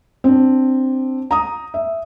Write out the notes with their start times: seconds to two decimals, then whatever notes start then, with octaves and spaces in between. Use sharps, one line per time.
0.24 C4 D4
1.31 A#5 D#6
1.74 E5